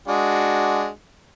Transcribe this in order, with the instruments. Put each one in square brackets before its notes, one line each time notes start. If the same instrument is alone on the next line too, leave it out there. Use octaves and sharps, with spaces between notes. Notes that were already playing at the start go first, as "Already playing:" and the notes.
[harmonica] G#3 D4 F#4